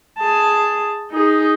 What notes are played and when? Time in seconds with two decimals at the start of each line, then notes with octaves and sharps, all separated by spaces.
0.19 G#4 A5
1.12 D#4 G#4